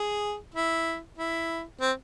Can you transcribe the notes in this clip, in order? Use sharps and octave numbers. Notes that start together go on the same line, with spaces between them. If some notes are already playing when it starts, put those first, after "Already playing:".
Already playing: G#4
E4
E4
C4